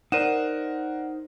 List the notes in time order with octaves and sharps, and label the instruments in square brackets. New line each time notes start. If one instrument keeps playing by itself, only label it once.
[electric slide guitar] D#4 C5 [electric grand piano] A#4 F#5 [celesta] D5 D#7 E7